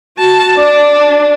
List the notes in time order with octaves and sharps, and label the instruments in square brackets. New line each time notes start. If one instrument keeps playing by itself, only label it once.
[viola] F#4 A5
[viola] D4 [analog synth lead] D5